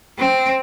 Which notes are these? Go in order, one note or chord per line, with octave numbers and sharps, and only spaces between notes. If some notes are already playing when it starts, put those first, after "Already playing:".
C4